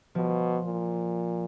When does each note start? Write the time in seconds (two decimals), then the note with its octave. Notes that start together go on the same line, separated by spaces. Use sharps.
0.15 B2 F3
0.65 A#2